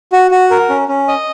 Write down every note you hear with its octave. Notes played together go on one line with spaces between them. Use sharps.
F#4
F#4
A#4
C#4
C#4
D#5